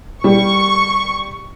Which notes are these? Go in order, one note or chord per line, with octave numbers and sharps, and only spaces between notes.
G3 C#6